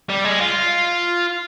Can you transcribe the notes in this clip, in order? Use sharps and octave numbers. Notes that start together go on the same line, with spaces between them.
G3
G#3
F4